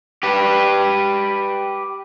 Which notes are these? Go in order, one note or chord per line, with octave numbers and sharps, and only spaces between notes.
G4 B4